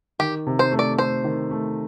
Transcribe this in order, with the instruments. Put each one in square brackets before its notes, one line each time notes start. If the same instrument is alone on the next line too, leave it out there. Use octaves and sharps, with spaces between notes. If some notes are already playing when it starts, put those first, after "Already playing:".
[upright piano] D#3 [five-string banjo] G4
[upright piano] C3
[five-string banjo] C5
[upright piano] A3
[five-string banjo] D5
[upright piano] A3 [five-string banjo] C5
[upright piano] D#3
A3